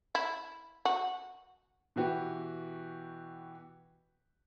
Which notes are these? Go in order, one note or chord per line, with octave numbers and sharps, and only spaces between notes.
E4
F#4
B2 E3 F#4 G4 B4